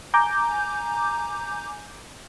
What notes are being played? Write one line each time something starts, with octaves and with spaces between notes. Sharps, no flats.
G#5 A#5 D6 G6